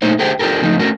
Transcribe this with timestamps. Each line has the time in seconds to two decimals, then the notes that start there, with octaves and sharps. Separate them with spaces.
0.02 A#2 A3 D#4 C5 C#5
0.19 D3 A3 G4 G#4 C5 G5
0.39 D4 F4 G4 A4 A#4
0.62 C#3 F3 A3 D#4
0.79 A3 C#4 D4 F#4 A#4